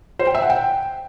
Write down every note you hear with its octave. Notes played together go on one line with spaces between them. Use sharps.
C5
G5
E5
F#5
G5